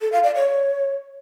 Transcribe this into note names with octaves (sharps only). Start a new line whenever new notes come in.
A4
F5
D5
C#5